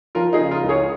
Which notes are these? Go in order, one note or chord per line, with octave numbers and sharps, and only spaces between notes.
F3 F4 A#4
D#4 G#4
C#3
F4 A#4
C#2
G#4 C#5